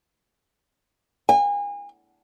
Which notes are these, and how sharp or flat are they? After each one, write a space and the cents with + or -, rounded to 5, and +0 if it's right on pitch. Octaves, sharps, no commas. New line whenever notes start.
G#5 -35